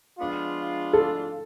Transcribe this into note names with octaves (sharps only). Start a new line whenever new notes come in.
F3 G#3 B3 D4 F4
A4